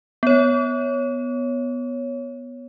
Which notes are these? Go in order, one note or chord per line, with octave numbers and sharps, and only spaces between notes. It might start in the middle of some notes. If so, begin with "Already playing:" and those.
B3 C#5